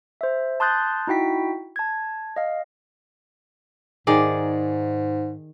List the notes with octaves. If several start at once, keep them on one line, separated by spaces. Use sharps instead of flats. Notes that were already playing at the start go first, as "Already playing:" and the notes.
C5 E5
A5 C6 D#6 F#6 G6 A6
D#4 E4 F#4 G5 B6
A5 G#6
D#5 F5
G#2 D#3 G#4 D5